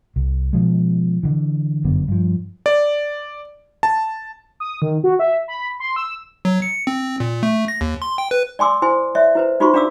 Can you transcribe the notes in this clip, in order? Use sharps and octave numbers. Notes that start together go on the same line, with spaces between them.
C2
B2 F3 G#3
D3 E3
G1 F#2 D3 B3
G2 F3
D5
A5
D#6
D#3
F#4
E5
B5
C6
E6
F#3
C#7
C4
A#2
A3
A#6
D#2
C6
G5
B4
D5 G#5 C6 D6 E6
E4 C5 G#5 C6
C#5 D5 E5
E4 B4 C5
D#4 F4 F#4 C5 C6 C#6
D4 D5 F5 D6 E6